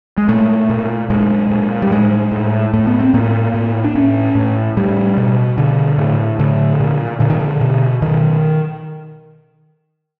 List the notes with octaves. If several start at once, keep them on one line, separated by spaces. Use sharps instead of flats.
G#3
A#2 A3
A#2
A#2 G#3
A#2
G3
A2 G#3
A2
A2 A3
B3
C4
A2 A#3
A2
D4
A2 C#4
A2
A2 G3
B2
B2 D3
A2
A2 D3
A#2
A#2 D3
D#3
D3
B2
B2 D#3